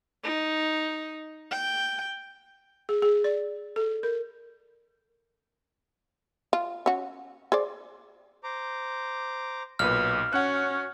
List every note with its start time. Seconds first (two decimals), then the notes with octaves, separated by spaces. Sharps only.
0.23 D#4
1.51 G5
2.89 G#4
3.02 G#4
3.24 D5
3.76 A4
4.03 A#4
6.53 F4
6.86 C#4 F#4
7.52 G#4 C5 D5
8.44 C5 A#5 D6
9.79 B1 A#2 B4 F6
10.33 C#4 F#4 F#5 F#6